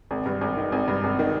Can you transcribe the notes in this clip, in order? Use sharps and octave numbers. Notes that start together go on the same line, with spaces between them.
G#1
G2
G#1
D#3
G#1
G2
G#1
D#3